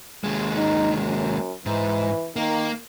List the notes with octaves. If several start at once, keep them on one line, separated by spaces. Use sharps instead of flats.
D#2 G#3
D#4
F#2
G#2 E3
D#3 A#3